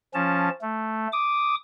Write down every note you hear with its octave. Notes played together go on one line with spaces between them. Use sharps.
F3 C#4 A5
A3
D6 D#6